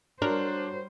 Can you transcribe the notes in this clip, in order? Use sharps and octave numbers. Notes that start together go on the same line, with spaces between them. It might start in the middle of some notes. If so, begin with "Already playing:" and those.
G3 D4 F#4 A#4 C5 C#5